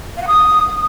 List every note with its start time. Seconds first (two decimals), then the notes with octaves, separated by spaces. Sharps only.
0.17 F5
0.22 F#5
0.27 D#6